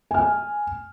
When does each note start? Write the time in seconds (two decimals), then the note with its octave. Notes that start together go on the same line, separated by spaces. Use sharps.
0.11 G#5 F6